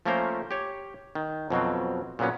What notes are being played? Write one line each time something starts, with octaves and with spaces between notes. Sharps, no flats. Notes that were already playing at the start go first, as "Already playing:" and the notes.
F3 A3 A#3 C#4 A#4 C5
G4 C#5
D#3
F2 B2 F#3 C4
A#2 C#3 F#3 B3 C#4